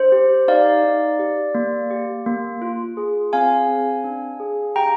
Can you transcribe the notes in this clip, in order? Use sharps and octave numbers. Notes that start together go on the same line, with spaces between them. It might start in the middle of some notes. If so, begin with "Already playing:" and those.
Already playing: D4 C5
G4
D#4 D5 F5
D#4
G4
A#3
G4
A#3
F4
G#4
C4 F5 G#5
C4
D4
G#4
G4 G5 A#5